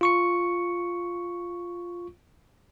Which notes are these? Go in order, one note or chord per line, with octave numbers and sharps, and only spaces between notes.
F4 C#6 C#7